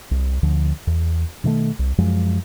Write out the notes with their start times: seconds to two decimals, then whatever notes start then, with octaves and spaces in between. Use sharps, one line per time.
0.11 C2
0.43 D2 D3 F3
0.87 E2
1.44 B2 D#3 G#3 A3
1.79 C2
1.98 F#2 F3 G#3